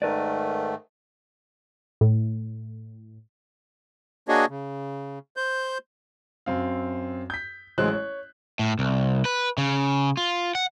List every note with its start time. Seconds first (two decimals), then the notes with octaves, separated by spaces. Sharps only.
0.02 G#2 D#3 A3 A#4 B4 D5
2.01 A2
4.28 A#3 D4 F#4 G#4 C#5 D#5
4.49 C#3
5.37 C5 G6
6.46 F#2 C4 F5
7.30 G6 B6
7.78 A1 F#3 G#3 C5 F#6
7.93 C#5
8.59 A2
8.79 C2
9.25 B4
9.58 C#3
10.17 F4
10.55 F#5